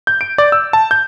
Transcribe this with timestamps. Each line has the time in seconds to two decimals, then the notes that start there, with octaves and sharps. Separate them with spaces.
0.07 G6
0.21 D7
0.38 D5
0.52 E6
0.73 A5
0.91 G6